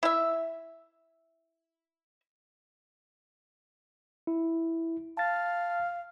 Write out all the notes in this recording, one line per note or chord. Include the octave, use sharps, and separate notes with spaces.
E4 E5
E4
F5 A5 A6